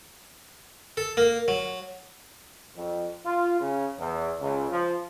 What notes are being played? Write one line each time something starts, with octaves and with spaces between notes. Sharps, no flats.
A4
A#3
F#3
F2
F4
C#3
E2
C#2
F3